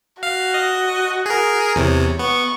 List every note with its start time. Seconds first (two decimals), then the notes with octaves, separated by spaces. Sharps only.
0.23 F#4 F5
0.54 D#5
1.26 G#4 A#4
1.76 E2 C3 C#5
2.19 B3 C#6